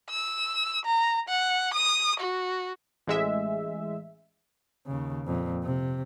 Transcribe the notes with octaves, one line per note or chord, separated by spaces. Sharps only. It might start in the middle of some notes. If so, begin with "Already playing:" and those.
E6
A#5
F#5
D#6
F#4
A1 G#3 E5
D#2 C#3
F2 A#2
C3